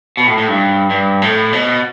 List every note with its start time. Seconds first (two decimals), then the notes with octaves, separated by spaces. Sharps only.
0.17 B2
0.27 A2
0.38 A2
0.48 G2
0.90 G2
1.22 A2
1.53 B2